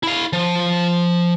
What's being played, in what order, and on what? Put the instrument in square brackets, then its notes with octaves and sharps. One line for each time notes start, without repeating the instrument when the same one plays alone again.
[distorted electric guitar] E4 F5
F3